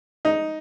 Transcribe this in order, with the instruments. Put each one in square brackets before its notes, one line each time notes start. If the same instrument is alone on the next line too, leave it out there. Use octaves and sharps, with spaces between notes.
[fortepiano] D#4